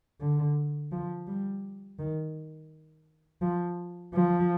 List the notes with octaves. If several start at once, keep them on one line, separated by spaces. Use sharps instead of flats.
D3
F3
G3
D#3
F3
F3